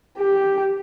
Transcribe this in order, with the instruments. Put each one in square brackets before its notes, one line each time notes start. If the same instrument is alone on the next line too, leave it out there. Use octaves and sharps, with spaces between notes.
[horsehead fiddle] G4